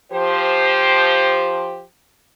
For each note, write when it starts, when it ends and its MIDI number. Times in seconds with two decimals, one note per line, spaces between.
0.12 1.82 53
0.12 1.82 67
0.12 1.82 72